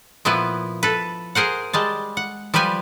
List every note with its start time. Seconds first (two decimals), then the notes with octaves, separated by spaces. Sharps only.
0.25 A#2 F3 B3 E4 B4
0.83 A4 B4
1.35 G#4 A#4 C5 F#5
1.73 G3 G#3 A5
2.17 F#5
2.54 F3 G3 G4 B4 G#5